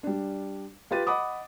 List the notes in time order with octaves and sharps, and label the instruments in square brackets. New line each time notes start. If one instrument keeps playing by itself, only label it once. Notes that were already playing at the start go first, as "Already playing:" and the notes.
[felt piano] G3 D4
F4 G4 B4 A6 D#7
D#5 F#5 B5 D6 D#6